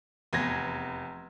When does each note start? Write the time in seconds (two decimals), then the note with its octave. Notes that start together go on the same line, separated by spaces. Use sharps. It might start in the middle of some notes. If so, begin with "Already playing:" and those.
0.33 F1 E2 G#6 A#6